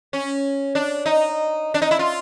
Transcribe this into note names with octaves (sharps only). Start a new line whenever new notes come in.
C#4
D4
D#4
D4
D#4
E4
F4